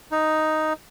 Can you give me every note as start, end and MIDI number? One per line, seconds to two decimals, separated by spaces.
0.11 0.73 63